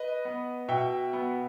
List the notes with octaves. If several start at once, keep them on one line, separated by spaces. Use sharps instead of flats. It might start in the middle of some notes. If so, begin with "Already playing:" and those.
Already playing: B4 D#5
B3
B2 E5 G5
B3